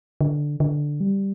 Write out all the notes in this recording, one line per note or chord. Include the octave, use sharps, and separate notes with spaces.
D3
D3
G3